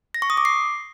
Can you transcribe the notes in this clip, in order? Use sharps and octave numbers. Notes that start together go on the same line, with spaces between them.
A#6
C#6
D#6
D6
C7